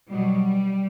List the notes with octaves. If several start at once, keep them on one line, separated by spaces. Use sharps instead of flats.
B2 F#3 G3